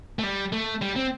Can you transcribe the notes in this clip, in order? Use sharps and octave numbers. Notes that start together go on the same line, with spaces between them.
A3
G3
A3
G3
C4